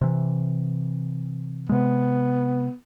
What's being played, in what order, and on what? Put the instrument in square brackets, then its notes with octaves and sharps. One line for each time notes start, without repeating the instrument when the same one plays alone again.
[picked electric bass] C3 E3
[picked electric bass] C3 G#3 [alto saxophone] B3